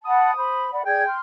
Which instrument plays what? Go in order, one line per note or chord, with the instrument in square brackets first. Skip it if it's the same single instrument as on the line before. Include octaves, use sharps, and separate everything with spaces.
[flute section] F#5 A5 B5 [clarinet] D#6
[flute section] C5 B5
D5 F#5 B5
[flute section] G#4 D5 G#6 [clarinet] G5
[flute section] C6 F6